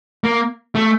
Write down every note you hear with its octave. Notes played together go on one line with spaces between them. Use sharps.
A#3
A3